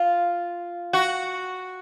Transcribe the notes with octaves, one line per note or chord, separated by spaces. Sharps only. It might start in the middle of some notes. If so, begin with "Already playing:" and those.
Already playing: F4
F#4